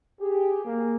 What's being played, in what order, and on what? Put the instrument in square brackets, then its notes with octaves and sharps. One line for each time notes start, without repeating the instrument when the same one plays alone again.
[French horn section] G4 [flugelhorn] G#4
[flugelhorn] A#3 [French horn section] G#4